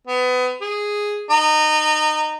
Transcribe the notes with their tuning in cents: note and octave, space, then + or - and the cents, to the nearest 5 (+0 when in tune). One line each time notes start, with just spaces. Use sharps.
B3 +30
G#4 -5
D#4 -20